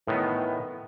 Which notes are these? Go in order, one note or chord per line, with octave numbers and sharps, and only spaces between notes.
A2 D#3 E3 B3